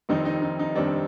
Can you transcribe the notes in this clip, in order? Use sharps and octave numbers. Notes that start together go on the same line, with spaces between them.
F1 F2 D#3 G3 C4 D#4
D#4
D#4
D#4
F1 F2 D#3 G3 C4 D4